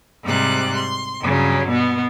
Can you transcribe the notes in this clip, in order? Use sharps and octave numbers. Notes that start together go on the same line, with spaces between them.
G#2 C3 G3 D6 F#6
C6
G2 C#3 F#3
B2 B3